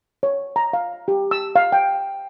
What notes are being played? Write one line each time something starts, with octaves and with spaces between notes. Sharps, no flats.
C#5
A#5
F5
G4
E6
F5
G5